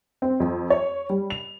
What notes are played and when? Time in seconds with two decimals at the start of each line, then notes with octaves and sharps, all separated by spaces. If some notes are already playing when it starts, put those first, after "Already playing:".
0.22 C4
0.40 F2
0.70 C#5
1.09 G3
1.30 F7